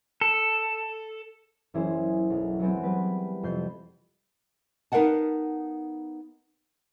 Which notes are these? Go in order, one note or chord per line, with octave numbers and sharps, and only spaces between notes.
A4
F#1 E3 C#4 E4 G#4 C5
B1
F#3 G#3 B3 C4
G3 B4
F2 C3 G6 C7
B3 D#4 A#4 F5 F#5 A5